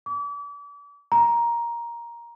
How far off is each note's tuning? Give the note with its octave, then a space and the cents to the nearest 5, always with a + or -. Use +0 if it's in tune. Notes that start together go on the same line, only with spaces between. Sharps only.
D6 -40
A#5 +10